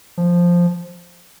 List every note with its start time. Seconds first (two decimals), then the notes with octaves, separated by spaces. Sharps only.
0.18 F3